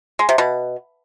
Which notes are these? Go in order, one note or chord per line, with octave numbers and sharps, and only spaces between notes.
G#3
C3
B2